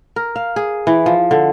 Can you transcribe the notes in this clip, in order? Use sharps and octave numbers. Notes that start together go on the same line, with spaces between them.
A#4
F5
G#4
E3
F3
D3